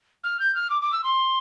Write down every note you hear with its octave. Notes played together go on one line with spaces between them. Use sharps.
F6
G6
F6
D6
D6
E6
C6